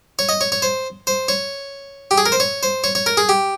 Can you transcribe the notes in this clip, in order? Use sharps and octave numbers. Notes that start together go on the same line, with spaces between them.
C#5
D#5
C#5
C#5
C5
C5
C#5
G4
G#4
A#4
C5
C#5
C5
C#5
C#5
A#4
G#4
G4